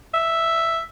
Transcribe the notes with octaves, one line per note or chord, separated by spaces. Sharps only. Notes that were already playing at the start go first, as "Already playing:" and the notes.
E5